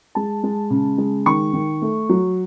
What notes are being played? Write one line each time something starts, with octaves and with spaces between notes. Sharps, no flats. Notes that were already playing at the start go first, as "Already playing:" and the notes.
G#3 A5
G#3
C#3
G#3
D#3 C#6
D#3
A3
F#3